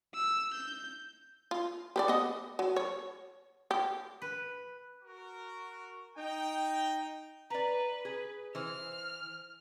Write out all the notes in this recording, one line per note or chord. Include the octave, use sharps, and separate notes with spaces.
E6
G6
F4
G4 B4 D5
B3 D#5
F#3
C#5
G4
B4
F#4 A#4
D#4 G5
B4 D5 A#5
G#4
E3 C5 F6